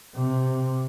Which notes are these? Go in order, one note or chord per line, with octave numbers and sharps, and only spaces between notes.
C3